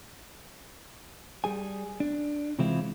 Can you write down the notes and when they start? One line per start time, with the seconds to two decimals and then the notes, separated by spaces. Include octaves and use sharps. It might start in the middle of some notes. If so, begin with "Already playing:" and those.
1.44 G3 G#4 G#5
2.00 D4
2.59 C3 E3 G#3 C4 E4 F4